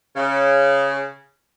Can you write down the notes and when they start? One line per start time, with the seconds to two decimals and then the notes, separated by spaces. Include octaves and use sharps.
0.16 C#3